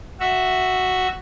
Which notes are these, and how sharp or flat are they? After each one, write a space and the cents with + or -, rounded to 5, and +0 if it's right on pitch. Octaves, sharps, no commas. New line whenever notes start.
F#4 +0 E5 +0